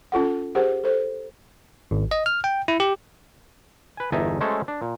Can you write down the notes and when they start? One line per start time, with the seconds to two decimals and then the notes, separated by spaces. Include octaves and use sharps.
0.12 C#4 F4 A4 F#5
0.55 G4 G#4 A#4 C5 F#5
0.84 A4 C5
1.91 G#1
2.11 D#5
2.26 F6
2.44 G5
2.68 E4
2.80 G4
3.97 B4 G#5
4.12 G1 E2 D#4 E5 G#5 A5
4.40 F#3 G#3 A3 C#4 A4 C5
4.68 D4
4.82 A#2